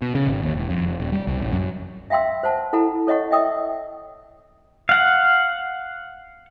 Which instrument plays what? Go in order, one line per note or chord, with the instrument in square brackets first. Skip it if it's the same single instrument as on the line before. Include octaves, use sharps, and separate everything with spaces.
[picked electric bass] B2
C#3
G#1
D#2
E1
F2
F1
D#1
G3
C2
A1
F#2
[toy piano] E5 F5 G5 C6 E6
C5 F#5 A5
E4 A4 F#5 A5 A#5
A4 C#5 D#5 F#5 C#6
D#5 E5 G5 D#6 E6
[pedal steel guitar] F5 F#5